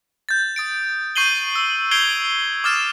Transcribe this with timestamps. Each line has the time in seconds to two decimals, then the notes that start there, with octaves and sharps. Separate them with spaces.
0.29 G6 A6
0.56 D#6 A6 D7
1.16 C#6 G6 C7 D#7 F#7 G7
1.56 E6
1.91 G6 G#6 C7 D7 F7 G7
2.64 D6 D#6 F6 A6 E7